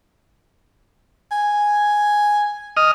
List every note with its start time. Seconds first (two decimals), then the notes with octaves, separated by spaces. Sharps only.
1.32 G#5
2.77 D#5 D#6 F6